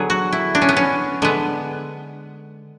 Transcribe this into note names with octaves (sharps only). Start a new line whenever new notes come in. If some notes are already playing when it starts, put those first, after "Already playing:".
Already playing: D3 F#3 B3 G#4
F#4
E4
D4
C#4
B3
C#4
D3 G#3 B3